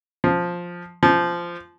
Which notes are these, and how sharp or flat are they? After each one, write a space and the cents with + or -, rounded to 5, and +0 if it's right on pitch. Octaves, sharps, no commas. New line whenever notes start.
F3 +5
F3 -15